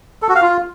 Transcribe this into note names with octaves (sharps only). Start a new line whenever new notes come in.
A4
F#4
F5
F4